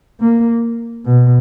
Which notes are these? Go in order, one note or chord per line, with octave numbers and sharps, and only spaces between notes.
A#3
B2